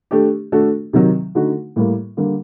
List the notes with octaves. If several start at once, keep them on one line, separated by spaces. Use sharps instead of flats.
A3 D4 G4
A3 D4 F#4 A4
C3 D#3 F#3
D3 A3 D#4 F#4
A2 G3 A#3
D3 G3 A#3